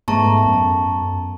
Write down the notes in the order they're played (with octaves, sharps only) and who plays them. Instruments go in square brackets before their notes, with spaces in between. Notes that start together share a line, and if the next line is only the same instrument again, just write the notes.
[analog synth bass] G#2 [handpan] A3 B3 [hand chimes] A5 A#5 C#6
[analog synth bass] F#2